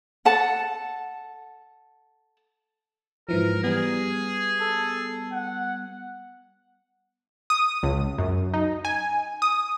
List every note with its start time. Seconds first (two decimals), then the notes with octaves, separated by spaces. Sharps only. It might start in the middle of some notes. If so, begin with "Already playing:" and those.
0.25 A4 F#5 A5
3.29 G#2 E3 F3 A#4
3.63 G3 B3 G#4
4.61 A4
5.32 F#5
7.50 D#6
7.83 C#2
8.18 F#2
8.54 D#4
8.85 G#5
9.42 D#6